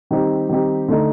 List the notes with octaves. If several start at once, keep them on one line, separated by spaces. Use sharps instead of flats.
D#3 G3 C4 D#4 G4
D#3 G3 C4 D#4 G4
D3 A3 D#4